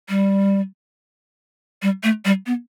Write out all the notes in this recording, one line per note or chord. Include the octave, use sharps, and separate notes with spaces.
G3
G3
A3
G3
B3